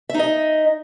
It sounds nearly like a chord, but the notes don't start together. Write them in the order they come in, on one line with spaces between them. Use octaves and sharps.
E5 D#4 D#5